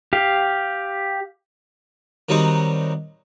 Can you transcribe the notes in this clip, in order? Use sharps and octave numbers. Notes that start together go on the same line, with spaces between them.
G4 F5
D#3 F#3 G3 C4 D#4